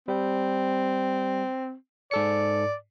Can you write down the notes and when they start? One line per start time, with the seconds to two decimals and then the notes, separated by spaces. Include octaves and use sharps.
0.08 G3 C4
2.11 G#2 A4 D5 C#7